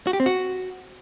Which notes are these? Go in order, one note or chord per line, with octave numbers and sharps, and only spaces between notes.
F#4
G4
C4
F#4